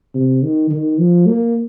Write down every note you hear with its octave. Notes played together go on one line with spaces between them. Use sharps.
C3
D#3
D#3
F3
A#3